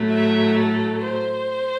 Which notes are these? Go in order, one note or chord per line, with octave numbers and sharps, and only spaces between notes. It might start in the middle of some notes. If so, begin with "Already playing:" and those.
Already playing: A2 F#3 A3
E5
A4
C5